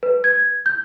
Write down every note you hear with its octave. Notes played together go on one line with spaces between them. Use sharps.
B4
G#6
G6